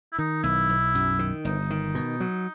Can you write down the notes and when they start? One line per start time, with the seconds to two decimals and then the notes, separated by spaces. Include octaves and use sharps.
0.13 E4
0.19 D#3 D#4
0.43 B1 E4
0.69 B1
0.95 F#2
1.19 D#3
1.45 G1 D#4
1.70 D#3
1.95 B2
2.20 F#3